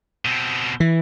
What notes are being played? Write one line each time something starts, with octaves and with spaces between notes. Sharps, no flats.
B2 C4
E3